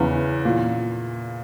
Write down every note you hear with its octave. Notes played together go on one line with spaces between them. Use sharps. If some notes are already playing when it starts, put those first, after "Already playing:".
Already playing: E2 C#3 E3
A#2